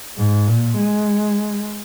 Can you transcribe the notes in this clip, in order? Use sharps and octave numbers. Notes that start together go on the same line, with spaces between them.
G#2
A#2
G#3